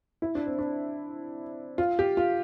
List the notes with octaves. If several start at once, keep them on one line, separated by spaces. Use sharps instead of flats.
E4
D4
C4
D4
F4
G4
F4